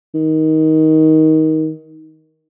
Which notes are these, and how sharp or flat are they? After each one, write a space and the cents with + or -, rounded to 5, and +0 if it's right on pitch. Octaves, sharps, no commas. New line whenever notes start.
D#3 +15